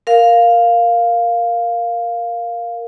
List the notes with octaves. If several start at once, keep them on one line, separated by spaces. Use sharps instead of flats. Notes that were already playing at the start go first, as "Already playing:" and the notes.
A#4 F5